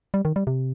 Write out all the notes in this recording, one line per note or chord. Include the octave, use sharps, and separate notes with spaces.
G3
D#3
G3
C3